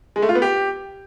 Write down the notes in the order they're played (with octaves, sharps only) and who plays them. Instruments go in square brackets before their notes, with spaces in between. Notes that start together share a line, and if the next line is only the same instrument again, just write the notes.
[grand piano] G#3
A3
F4
B3
G4